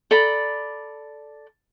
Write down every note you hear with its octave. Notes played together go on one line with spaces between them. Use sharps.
A4 D5 A#5 B5